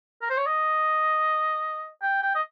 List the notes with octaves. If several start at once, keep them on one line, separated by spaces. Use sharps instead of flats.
A#4
C5
C#5
D#5
G5
G5
D#5